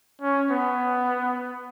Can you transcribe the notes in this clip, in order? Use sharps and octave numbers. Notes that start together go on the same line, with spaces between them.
C#4
B3